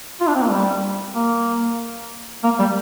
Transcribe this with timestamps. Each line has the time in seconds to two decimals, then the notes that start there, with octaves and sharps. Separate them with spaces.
0.21 F4
0.27 D4
0.35 C4
0.42 A#3
0.50 G3
1.14 A#3
2.43 A#3
2.59 G3